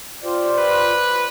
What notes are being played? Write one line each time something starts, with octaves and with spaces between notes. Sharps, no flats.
F4 G4 C5 D5
B4